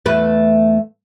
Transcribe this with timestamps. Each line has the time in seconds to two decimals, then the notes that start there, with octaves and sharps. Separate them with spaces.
0.05 E2 A3 B4